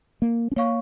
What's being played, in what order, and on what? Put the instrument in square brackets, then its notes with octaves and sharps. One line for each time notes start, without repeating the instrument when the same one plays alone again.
[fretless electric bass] A#3
C#4
[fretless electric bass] A#3 [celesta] C#5 F5 C#6